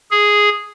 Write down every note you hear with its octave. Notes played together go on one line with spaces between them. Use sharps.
G#4